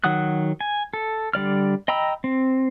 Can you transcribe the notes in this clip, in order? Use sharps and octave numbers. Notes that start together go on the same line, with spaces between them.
D#3 F#3 F#5 D#6 F#6
G#5
A4
D3 G3 D5 F6
D#5 G5 A#5 B5 E6
C4